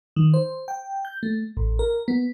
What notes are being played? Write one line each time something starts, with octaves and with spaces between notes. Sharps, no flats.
D#3
C5
G5
G6
A3
A1
A#4
B3